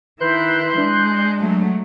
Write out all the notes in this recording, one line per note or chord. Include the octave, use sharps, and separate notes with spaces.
D#3 E4 B4 C6 F#6 G6
G#3 D4
F#3 A3